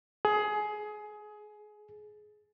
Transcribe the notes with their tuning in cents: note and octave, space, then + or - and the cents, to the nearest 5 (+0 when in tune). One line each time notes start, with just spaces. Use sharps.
G#4 +20